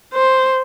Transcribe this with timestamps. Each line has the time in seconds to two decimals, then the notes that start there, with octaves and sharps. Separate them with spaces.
0.14 C5